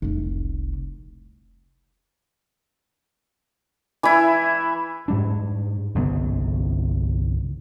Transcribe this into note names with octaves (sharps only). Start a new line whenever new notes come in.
F1 C2
E3 E4
G#2 G3 D4
G1 C2 C#3 B3